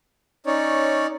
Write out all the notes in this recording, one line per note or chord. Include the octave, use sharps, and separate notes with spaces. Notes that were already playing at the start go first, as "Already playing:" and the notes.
C#4 D#4 C#5 D5